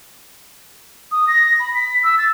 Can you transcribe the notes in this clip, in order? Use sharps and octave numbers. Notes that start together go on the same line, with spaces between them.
D#6
A#6
B5
B6
E6
A6